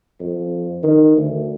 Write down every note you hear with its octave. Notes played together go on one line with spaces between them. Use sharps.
F2
D#3
D2